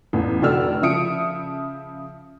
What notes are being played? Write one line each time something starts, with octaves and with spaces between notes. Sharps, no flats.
A1 E2
F1 D3 F#4 D5 E6 F6
C#3 F3 E5 D#6 C#7 D7